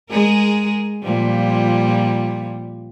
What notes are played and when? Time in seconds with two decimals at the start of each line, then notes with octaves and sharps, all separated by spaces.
0.10 G#3 G#4 A#4
1.02 A#2 F3 G3